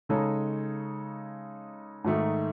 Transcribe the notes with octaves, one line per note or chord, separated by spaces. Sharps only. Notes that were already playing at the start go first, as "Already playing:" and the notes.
C#3 G#3 D#4 A4 C#5
G#2 D#3 A3 D#4